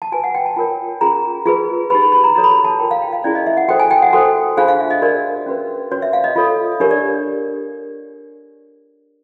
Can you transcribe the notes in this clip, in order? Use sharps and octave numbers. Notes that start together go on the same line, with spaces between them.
A5
F#4 B4 G#5
F#5
G5
A5
F4 A#4 C#5
C#4 F4 G#4 A#5
F4 G#4 B4
D#4 G4 B4 B5
B5
B5
A#5
D#4 F#4 A4 C#5 A#5
B5
A#5
A5
F4 A#4 C#5 G5
F5
G5
F5
C#4 E4 G#4 C#5 D5
D#5
E5
F#5
F#4 A4 C5 G5
G#5
G5
F#5
F#4 A4 C5
D4 F4 G#4 C5 F5
F5
E5
D#5
D4 F#4 A#4 D5
C#4 F#4 B4
C#4 F#4 B4 C#5
E5
F5
D#5
F4 A4 C#5
D4 G4 A#4 C#5
D5